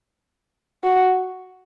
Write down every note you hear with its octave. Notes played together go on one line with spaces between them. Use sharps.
F#4